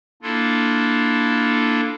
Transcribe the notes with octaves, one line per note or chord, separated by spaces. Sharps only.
A#3 D4 E4 F4 A4